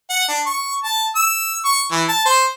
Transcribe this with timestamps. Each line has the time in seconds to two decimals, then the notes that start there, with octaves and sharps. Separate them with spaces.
0.10 F#5
0.28 D4
0.46 C#6
0.84 A5
1.16 E6
1.65 C#6
1.92 E3
2.09 A5
2.26 C5